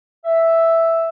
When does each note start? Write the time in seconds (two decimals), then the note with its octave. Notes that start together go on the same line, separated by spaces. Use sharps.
0.25 E5